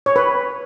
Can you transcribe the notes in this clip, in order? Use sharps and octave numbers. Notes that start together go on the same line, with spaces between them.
C#5
B4